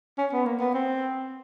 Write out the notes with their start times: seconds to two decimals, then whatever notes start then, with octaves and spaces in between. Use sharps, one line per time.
0.18 C#4
0.33 B3
0.46 A#3
0.60 B3
0.74 C4